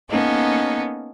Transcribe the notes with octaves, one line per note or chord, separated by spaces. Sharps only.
A#3 B3 C#4 D#4 A4